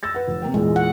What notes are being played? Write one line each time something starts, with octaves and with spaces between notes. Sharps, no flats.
E6 A6 A#6
B4 F#5
F1
C3 A#3 G5
E2 A#2 G#3
F#5